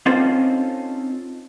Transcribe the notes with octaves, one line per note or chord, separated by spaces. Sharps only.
C4 C#4 D#4 F4 A4 C5